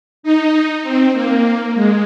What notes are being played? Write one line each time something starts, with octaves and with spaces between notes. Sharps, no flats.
D#4
C4
A#3
G#3